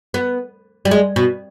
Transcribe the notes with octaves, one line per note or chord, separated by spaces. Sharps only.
B3
G3
G#3
B2